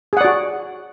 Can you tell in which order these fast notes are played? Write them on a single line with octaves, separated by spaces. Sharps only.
G#4 F#5 D5 F#4